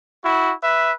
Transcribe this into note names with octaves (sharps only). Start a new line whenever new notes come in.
E4 F#4
B4 E5